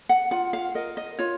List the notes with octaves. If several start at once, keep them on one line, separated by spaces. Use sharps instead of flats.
F#5
F4 F#5
F5
A#4 D#5
D#5
F4 C#5